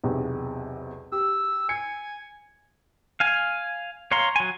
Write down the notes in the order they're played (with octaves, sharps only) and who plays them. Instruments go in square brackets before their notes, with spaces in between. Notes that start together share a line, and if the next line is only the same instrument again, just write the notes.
[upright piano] B1 E2 C3
[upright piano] G4 [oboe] E6
[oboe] G#5 [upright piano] C#7
[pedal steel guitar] F5 G#5
C#5 F5 A#5 C6
F#3 G#5